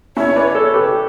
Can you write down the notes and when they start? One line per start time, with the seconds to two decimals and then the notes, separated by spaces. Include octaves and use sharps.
0.17 C#4 E4 C#5
0.36 B4 D5
0.55 A4 C#5
0.74 G4 B4